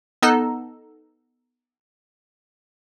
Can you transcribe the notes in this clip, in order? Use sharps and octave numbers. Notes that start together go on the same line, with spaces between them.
B3 D#4 A4